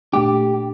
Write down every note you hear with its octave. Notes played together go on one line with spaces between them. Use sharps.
A#2 A3 D4 G4